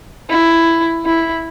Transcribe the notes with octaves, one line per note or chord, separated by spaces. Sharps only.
E4
E4